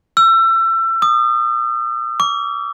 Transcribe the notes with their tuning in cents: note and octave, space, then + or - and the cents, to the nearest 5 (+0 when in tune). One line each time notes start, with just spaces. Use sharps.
E6 +30
D#6 -35
D6 -40